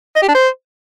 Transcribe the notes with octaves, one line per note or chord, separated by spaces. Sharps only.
D#5
G4
D4
C5